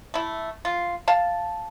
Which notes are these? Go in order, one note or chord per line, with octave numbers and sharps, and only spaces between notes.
A3 E4
F4
F5 A5